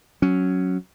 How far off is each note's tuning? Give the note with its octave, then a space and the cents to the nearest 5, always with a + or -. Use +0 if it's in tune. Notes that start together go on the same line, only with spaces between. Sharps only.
F#3 +0 C#4 +0